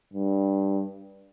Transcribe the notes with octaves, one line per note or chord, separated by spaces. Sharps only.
G2